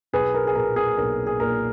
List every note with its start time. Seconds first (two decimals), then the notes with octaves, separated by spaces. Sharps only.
0.13 B1 G#4 B4
0.34 A#4
0.47 G#4
0.55 A#2 A#3 A#4
0.76 G#4
0.97 B1 A#4
1.27 G#4
1.40 A#2 A#3 A#4